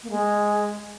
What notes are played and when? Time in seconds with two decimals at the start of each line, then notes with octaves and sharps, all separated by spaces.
0.03 A#3
0.10 G#3